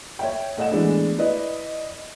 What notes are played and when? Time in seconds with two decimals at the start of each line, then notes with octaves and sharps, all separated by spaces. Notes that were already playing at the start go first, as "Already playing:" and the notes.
0.19 C#5 E5 G5
0.57 A2 A4 D#5 F#5 E7
0.71 E3 G#3 A3 B3 D4
1.18 E4 B4 D5 D#5